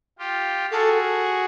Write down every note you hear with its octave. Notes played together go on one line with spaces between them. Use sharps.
F4 G4
F#4 G#4 A4